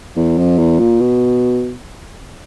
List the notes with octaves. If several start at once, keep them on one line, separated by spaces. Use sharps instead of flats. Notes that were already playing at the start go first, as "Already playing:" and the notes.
E2
F2
E2
A#2
B2